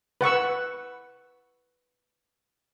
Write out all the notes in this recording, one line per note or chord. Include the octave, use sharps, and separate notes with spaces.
B4 F#5 C#6 E6